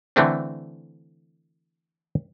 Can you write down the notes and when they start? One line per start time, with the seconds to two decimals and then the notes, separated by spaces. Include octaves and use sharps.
0.16 D3 E3 A3 C4 D4